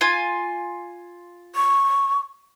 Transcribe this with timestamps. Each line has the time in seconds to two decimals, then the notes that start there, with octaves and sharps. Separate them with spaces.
0.01 F4 G#5
1.56 C#6